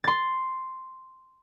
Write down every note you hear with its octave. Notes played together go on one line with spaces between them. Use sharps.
C6 A6